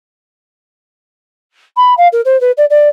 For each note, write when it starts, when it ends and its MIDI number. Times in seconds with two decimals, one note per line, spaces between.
1.77 1.94 83
1.97 2.08 77
2.12 2.21 70
2.25 2.39 72
2.41 2.51 71
2.57 2.65 74
2.70 2.89 74